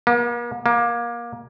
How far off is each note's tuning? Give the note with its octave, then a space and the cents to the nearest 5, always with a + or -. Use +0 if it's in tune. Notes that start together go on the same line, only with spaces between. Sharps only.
A#3 +45
A#3 +25